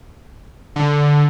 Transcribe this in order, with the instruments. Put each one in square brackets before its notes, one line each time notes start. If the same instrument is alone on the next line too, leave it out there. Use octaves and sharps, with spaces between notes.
[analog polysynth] D3